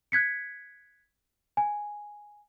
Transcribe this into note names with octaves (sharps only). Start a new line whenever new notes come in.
F#6 G#6 B6 C#7
G#5